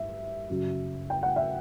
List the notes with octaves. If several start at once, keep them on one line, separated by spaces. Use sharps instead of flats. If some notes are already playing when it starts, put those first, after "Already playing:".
Already playing: G2 E5
F#2 C#3 F#3
G5
F#5
E5